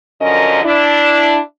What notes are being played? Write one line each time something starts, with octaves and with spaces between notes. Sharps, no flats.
F#2 D3 F3 C#4 A#4 D#5
D4 E4